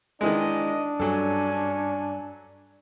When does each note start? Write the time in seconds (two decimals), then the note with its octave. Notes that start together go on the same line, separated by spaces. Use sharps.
0.21 D#3 E3 G#3 D4 D#5
1.00 G2 F#3 C#4 A4 G#5